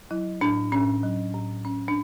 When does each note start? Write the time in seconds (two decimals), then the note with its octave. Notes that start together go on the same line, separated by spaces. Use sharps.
0.11 F#3 E4
0.41 A2 D4
0.72 A2 C#4
1.03 F#3
1.34 A2
1.65 A2 C#4
1.88 D4